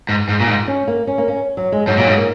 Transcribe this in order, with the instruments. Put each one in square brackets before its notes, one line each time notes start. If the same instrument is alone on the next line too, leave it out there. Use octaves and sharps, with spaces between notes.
[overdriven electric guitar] G#2
G#2
A#2
G#2
[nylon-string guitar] C#4
A#3
C#4
A#3
C#4
F#3
G#3
[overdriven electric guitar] G#2 [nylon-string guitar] F#3
[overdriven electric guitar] A#2
G#2
[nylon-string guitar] A#3